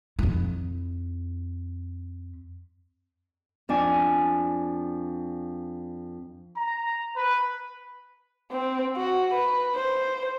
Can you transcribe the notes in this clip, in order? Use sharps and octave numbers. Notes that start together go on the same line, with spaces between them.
F2 E4
F2 D4 G#5
A#5
B4
C4
F#4
B4
C5